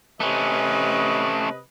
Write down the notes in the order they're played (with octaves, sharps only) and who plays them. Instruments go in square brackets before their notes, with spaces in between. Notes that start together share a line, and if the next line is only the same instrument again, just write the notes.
[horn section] C3 B4 D#5 [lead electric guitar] A3 C#4